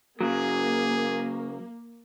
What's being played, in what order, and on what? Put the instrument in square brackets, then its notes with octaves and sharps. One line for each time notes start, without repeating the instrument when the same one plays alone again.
[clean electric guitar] C#3 F#3 [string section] A#3 [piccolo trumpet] G#4